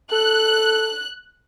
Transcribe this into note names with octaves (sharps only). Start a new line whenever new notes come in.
A4 F#6